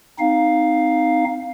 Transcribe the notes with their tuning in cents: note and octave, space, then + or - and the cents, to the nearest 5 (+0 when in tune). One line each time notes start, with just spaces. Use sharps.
C4 -25 D#4 +0 F5 +5